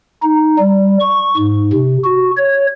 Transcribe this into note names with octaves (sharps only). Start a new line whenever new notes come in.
D#4
G3
C#6
G#2
C3
F#4
C#5